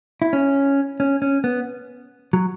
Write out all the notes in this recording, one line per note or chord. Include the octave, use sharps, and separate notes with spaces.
E4
C#4
C#4
C#4
B3
F#3